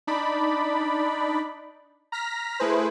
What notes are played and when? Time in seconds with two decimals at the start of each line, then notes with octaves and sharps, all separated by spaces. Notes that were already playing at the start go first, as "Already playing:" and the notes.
0.07 D4 D#4 D5 B5
2.12 A#5 F6 A#6 B6
2.60 A3 E4 G#4 B4 C5